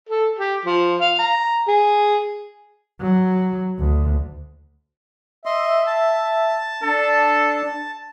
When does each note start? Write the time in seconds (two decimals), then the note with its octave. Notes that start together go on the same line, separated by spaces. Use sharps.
0.09 A4
0.39 G4
0.65 F3
1.01 F5
1.19 A#5
1.68 G#4
3.01 F#3
3.79 D2
5.45 D#5 E5 C6
5.86 A5
6.83 D4 A4